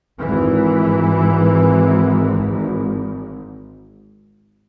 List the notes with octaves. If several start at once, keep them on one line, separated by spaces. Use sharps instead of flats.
G#1 G#2 E3